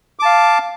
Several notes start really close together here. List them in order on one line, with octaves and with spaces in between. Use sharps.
D6 A5 F5